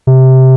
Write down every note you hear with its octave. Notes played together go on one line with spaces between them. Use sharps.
C3